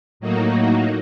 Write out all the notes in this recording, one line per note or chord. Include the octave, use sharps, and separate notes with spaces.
A2 F#3 A#3 D#4 F#4